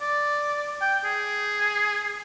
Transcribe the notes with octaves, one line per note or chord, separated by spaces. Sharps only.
D5
G5
G#4